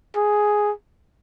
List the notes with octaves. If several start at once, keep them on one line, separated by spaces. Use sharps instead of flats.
G#4